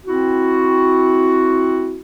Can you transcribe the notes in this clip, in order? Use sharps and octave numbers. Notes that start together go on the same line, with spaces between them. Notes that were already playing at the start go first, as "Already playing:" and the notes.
C4 E4 F#4